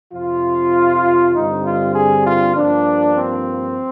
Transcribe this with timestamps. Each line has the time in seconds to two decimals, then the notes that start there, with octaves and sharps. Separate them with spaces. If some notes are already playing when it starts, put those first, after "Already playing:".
0.13 F2 C3 F3 F4
1.35 G2 D3 G3 C4 D#4
1.65 F4
1.95 G#4
2.25 F4
2.55 G2 F3 A#3 D4
3.17 C4